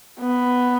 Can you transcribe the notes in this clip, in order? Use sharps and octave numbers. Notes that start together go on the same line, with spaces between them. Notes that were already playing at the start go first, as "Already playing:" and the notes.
B3